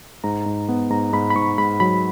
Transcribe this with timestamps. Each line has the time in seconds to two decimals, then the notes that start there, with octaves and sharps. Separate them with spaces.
0.24 G#2 A#5
0.46 G#2
0.69 B3
0.90 G#2 A#5
1.13 G#2 B5
1.31 B5
1.35 G#2 C#6
1.58 G#2 B5
1.80 F#3 B5